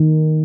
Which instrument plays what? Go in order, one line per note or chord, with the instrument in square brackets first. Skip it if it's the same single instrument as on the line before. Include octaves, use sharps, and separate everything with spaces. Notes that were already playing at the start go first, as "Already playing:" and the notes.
Already playing: [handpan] D#3